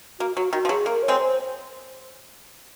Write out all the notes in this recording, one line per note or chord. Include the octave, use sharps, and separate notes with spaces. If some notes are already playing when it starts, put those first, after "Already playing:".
A#3 F#4
F#3 F#4
D#3 F#4
F3
F#3 G#4
A#3 A#4
C#5
G#3 C4
C5